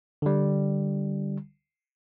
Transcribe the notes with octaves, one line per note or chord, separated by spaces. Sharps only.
D3 G3